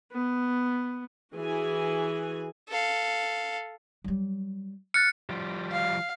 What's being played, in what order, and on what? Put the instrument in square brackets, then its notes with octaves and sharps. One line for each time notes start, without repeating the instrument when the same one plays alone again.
[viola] B3
[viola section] E3 F#4 G#4 G#5
[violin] A4 F5
[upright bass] F#3 G3
[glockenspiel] F6 F#6 A6 [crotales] C#7
[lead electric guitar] F3 G3
[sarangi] F5